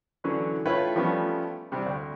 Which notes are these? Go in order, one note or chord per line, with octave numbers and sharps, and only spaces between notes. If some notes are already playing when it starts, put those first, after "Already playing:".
D3 E3 F#3 C#4 D4
A3 E4 F4 B4 C#5 G5
F3 G3 A3 B3 C#4
C3 G3 D4
D2